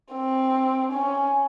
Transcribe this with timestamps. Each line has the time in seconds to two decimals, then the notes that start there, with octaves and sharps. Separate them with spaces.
0.12 C4
0.92 C#4